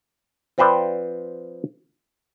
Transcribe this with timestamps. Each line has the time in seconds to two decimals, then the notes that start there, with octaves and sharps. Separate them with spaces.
0.58 F3 C4 B4 C5 D5 F5